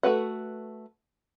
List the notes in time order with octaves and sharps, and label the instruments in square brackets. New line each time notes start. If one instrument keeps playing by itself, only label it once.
[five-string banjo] A3 E4 F#4 B4 F#5